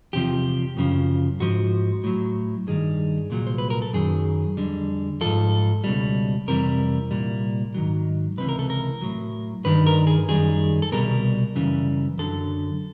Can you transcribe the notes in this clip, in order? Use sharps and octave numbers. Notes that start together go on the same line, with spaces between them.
E2 C3 F3 G4
F#2 C#3 F3
G#2 F3 F#4
A2 F#3
G2 D#3 G3 G#4
C2 A#2 F#3
C5
B4
A#4
A4
F#2 D#3 F#3 G#4
F2 D3 G3
G#2 F3 A4
C#2 B2 G3
F2 C3 E3 G3 A#4
C2 A#2 G3
G#2 D#3 F#3
C#2 C3 E3 B4
A#4
A4
A#4
A2 F#3
G2 D#3 G3 B4
A#4
G#4
F#2 D#3 G3 G#4
A4
C2 B2 G3 A#4
F#2 C#3 E3 G3
F#2 D3 F#3 A4